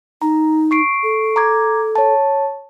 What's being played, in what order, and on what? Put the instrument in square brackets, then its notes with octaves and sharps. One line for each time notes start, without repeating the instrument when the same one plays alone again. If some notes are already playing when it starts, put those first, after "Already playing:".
[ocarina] D#4 [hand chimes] A#5
[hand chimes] C#6 C7 D7
[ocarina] A4
[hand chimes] A#5 D6 G#6
C#5 A5